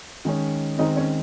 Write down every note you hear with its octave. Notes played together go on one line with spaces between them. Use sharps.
D#3 G#3 C#4
D#3 G#3 C4 D#4 D#5
C#4 C#5